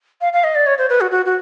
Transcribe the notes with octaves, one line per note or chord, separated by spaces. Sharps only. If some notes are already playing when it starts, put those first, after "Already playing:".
F5
F5
D#5
D5
C#5
C5
B4
F#4
F#4
F#4